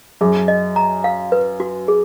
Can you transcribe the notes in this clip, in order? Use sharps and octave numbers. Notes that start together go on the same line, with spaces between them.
F#2 G#4
D#5
A#5
F5
B4
F#4
G#4